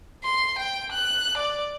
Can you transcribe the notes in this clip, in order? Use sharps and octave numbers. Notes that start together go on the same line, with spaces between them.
C6
G5
F#6
D5